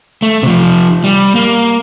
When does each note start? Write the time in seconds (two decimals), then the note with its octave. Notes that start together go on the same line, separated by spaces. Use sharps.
0.22 A3
0.43 C3 F3
1.04 G3
1.35 A#3